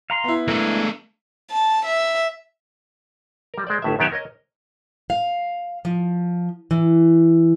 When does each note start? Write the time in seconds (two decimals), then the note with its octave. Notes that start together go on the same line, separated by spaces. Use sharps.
0.10 F5 A#5 C6
0.24 B3 E4
0.48 G#3 A3 D4 A#4
1.51 A5
1.85 E5
3.54 G3 A#4
3.67 G#3 C5 D5
3.82 G1 A2 E5
3.99 F#2 D#3 B3 G4 C#5 E5
4.12 A#4 C#5 D#5
5.10 F5
5.85 F3
6.71 E3